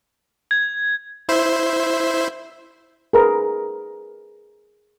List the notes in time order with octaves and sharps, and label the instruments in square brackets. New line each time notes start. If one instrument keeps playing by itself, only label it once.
[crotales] G#6
[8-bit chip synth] E4 C5 E5
[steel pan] G#4 A#4 B4